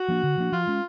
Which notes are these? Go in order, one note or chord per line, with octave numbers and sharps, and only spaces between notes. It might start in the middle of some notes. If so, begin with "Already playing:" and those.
Already playing: F#4
F3 A#3 D4
D3
F3 A#3 D4
F3 F4
G#3 C#4